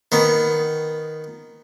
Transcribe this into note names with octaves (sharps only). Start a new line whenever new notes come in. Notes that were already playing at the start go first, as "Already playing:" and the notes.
D#3 B3